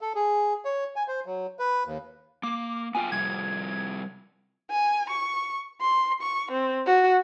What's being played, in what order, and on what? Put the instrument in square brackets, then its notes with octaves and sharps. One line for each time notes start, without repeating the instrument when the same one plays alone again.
[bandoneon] A4
G#4
C#5
G#5
C5
F#3
B4
D#2
[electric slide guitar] A#3 [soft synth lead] D6
[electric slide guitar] B3 F4 G5 [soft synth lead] G#5
[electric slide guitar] C3 F3 G3 [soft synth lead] G#6
[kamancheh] G#5
C#6
C6
C#6
C4
F#4